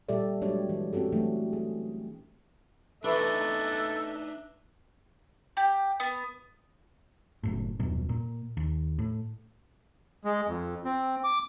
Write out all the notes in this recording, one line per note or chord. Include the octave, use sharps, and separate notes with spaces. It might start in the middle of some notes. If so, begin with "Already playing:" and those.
A#2 G3 G4 A4 D5 E5
F#3 G#3 D4 G4 C#5 D5
E3
C4 C#4 F#4 G4 A4
E3 F#3 A3 D4
G#4
E3 A3 D4 D#4 A4 B4 E5
G4
B3
F#1 F#2 A2
D#1 F#2 B2
A#2
D#2
A2
G#3
F2
C4
D6